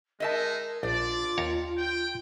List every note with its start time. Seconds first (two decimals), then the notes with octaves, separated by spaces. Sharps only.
0.20 G#3 D#4 A#4 D#5 E5 A5
0.83 A#1 D4 F4 D5
1.38 D#2 C#5 A#5
1.78 G5